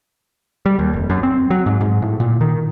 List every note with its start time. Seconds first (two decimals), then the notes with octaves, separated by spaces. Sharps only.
0.66 G3
0.79 D#2
0.93 F1
1.10 F#2
1.23 C4
1.50 F#3
1.66 G#2
1.81 G#2
2.02 A2
2.20 A#2
2.41 D#3